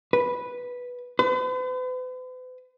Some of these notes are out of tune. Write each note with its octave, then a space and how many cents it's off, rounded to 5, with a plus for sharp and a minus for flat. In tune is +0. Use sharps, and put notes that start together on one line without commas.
B4 -5
B4 +45